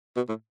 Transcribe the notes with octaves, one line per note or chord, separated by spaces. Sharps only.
B2
A2